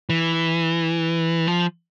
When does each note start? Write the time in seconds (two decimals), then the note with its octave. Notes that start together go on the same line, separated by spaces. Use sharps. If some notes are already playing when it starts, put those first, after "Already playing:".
0.10 E3
1.47 F3